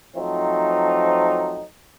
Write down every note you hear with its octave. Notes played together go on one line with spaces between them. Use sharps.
F3 F#3 A3 C4 D#4